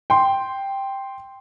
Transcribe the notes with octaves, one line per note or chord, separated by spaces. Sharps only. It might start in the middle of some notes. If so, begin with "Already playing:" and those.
G5 C6